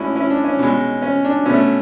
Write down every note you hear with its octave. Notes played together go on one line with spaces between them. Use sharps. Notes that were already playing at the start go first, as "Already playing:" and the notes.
Already playing: A2 G#3 C#4 D4 E4 F#4
C#4 E4
D4
C#4
B2 G#3
C#4
D4
B2 A3 C#4